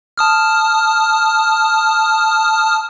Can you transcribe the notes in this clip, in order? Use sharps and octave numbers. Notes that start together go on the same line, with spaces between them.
A5 D#6 F6